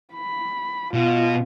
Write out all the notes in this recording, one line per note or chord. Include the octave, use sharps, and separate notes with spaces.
B5
B2 F4